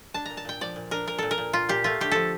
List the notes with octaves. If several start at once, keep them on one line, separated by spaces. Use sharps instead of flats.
D4 A5
A#2 A#5
A5
A#2 G5
F3 D5
A#2
D4 A#4
A#2 A#4
A#2 A4
A#4
A#2
A#2 F4
A#2 G4
A3 F4
D3 G4
F3 A4